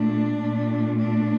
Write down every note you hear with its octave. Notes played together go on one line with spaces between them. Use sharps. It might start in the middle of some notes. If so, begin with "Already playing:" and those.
Already playing: A#2 A3 D4
A#2 A3
D4